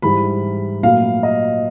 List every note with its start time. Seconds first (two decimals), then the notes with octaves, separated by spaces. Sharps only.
0.02 G#2 E3 G3 B5
0.83 A#2 F#3 A3 F5
1.23 D#5